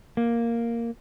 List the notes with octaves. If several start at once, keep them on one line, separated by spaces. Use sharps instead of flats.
A#3